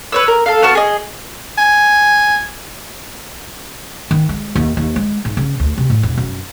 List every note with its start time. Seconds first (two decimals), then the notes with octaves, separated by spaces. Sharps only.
0.12 B4 C#5 E6
0.28 A#4
0.46 A4 F5
0.63 B3 F#4 A5 F6
0.75 G#4 D#5
1.58 G#5
4.11 D#3
4.29 G#3
4.55 D#2
4.77 D#2
4.96 G#3
5.25 G#2
5.37 C#3
5.60 D2
5.78 C3
5.90 A2
6.03 E1
6.18 F#2